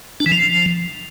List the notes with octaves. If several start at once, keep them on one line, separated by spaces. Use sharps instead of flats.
D4
E3
F3